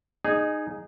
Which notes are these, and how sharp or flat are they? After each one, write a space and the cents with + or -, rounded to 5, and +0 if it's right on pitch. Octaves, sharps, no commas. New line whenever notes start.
D#4 -20 G#4 +0